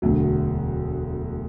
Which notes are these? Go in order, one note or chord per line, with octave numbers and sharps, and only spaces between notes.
E1 D2 D3 F#3